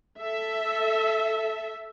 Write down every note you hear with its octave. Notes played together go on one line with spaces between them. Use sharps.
A4 E5